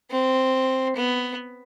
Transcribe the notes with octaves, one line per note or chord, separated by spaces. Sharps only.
C4
B3